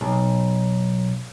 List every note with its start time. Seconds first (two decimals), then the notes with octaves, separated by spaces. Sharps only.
0.01 B1